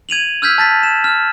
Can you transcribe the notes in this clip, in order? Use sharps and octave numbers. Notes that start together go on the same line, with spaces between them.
G#6 D#7 F7 F#7
E6 F6 G6 G#6 B6
A5 A6 B6
E7
F6